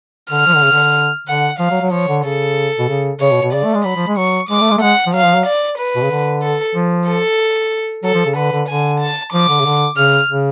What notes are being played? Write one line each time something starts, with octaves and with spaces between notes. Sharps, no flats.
D3 F6
F3
D3
C#3
D3
D3 F#5
F3 F5
F#3
F#3
F3 C#5
D3
C#3 A4
B2
C#3
C#3 C#5
B2
B2
C#3 D5
A3
G#3
F#3 B5
F3
G#3
F#3 C#6
G#3 D6
A3
G#3
A3
G#3 F#5
F3
F#3 F5
F3
F#3
D5
B4
B2
C#3
D3
A4
F3
A4
F#3 A4
F3
C#3
D3 B4
D3
D3 G#5
A5
F3 D6
D3
C#3
D3
C#3 F6
C#3